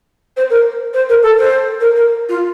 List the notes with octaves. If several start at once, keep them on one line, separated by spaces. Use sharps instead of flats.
C5
A#4
C5
A#4
A4
C5
A#4
A#4
F4